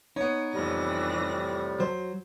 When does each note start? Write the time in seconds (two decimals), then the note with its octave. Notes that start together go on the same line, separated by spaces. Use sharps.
0.16 B3 D#4 C#5
0.53 F2 A2 C3 E3 G3 A#6
1.80 F#3 C5